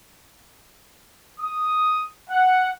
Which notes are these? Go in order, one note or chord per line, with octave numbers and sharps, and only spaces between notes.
D#6
F#5